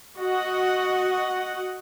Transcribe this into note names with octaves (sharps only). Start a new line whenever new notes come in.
F#4 D#5 F#5